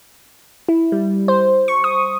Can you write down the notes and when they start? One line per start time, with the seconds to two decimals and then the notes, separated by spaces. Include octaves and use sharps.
0.68 E4
0.92 G3
1.28 C5
1.68 C#6
1.84 D#6